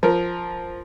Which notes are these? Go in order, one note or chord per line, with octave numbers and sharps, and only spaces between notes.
F3 A#4